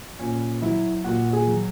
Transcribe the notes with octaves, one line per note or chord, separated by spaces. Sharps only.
A#2 C#4
F#3 E4
A#2 F#4
G#4
F#3